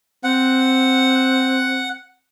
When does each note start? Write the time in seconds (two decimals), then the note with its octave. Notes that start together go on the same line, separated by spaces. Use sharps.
0.24 C4 F#5